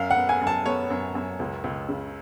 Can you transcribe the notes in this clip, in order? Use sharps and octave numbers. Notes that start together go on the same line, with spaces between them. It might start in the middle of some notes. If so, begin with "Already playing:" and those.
Already playing: F#2 F5
F#5
B3
G#5
F#2
A5
B3 C#5
F#2
F#2
C#2
C#2
C#3